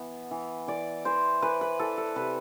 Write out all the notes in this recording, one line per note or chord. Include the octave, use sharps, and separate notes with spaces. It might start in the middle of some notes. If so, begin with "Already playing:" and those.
Already playing: E3 B3
E3
E3 D5
E3 C5
E3 B4
B4
E3 A4
A4
C3 B4